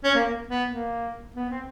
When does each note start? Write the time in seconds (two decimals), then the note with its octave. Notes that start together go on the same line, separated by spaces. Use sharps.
0.04 C#4
0.15 A#3
0.26 A#3
0.48 B3
0.70 A#3
1.36 B3
1.50 C4